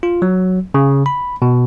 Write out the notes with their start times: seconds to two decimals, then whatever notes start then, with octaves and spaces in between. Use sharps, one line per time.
0.03 F4
0.22 F#3
0.74 C#3
1.06 B5
1.42 B2